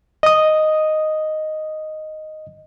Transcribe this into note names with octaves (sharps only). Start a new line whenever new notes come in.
D#5 D#6